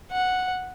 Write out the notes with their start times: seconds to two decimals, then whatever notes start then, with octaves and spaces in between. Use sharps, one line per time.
0.12 F#5